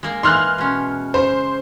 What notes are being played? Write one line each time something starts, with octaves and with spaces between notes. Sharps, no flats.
G#3 A#3
E3 G#3 A#3 C6 F6 F#6
B2 C#4
C#3 C5